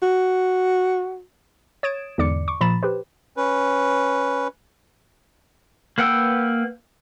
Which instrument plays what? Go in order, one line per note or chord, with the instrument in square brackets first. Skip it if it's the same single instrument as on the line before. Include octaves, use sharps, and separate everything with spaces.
[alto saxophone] F#4
[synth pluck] C#5 D#6 G#6 A6 D7 E7
E2 G#2 D3 D5 D6 C#7
C#6 D6
A#2 F3 A#5 B5 A6 E7
G4 B4 C5
[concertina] C#4 B4
[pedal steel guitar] A#3 B4 F#5 G5 E6